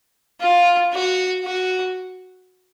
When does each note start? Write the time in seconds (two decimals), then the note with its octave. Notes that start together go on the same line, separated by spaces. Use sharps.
0.40 F4
0.93 F#4
1.44 F#4